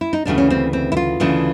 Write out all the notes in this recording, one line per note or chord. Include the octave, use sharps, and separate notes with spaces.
E4
D#4
D2 C#3 E3 A3 D4
C#4
C4
C4
E4
F4
D2 C#3 E3 A3